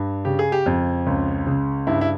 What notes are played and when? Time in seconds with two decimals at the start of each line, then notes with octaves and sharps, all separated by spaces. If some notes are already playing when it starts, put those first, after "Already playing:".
Already playing: G2
0.25 C#3 G4
0.39 G#4
0.52 G4
0.66 F2
1.07 C#2
1.47 C#3
1.87 G2 E4
2.01 E4